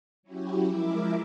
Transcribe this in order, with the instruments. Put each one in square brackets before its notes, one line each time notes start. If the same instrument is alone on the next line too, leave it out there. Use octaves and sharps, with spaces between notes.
[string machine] F#3 C#4 E4 F#4 G4
F3 G#3 E4 A#4 E5 D6